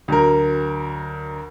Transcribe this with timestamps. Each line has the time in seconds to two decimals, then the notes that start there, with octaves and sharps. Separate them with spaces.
0.08 D2 F#3 A#4